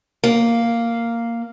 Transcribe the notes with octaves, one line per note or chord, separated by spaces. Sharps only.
A#3